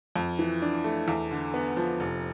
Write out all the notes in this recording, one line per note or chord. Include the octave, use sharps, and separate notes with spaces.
F2
E3
D4
A3
E2
D3
B3
F3
F1